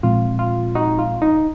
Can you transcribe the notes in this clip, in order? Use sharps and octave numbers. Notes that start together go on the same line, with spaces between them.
A#2 F3 G#3 C4 F4
F4
D#4 F#4
F4
D#4